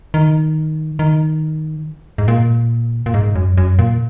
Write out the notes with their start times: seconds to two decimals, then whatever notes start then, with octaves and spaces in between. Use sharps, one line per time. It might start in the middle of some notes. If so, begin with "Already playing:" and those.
0.14 D#3
0.99 D#3
2.18 G#2
2.28 A#2
3.06 A#2
3.14 G#2
3.36 F#2
3.57 F#2
3.79 A#2